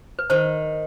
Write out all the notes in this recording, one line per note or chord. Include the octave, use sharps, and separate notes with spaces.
B4
D#3 C5